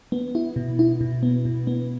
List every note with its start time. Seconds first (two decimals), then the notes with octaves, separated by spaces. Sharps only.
0.12 B3
0.35 E4
0.56 B2
0.79 E4
1.01 B2
1.23 B3
1.45 B2
1.67 B3